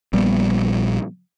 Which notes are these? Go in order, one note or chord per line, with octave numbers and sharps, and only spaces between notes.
A#1 A#2 G3 B3